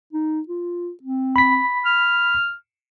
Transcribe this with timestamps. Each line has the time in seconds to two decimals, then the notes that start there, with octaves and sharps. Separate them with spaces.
0.13 D#4
0.48 F4
1.03 C4
1.36 B5 B6
1.85 F6